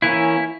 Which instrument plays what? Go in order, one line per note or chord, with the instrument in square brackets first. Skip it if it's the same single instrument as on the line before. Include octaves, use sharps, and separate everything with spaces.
[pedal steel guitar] E3 A#3 C#4 E4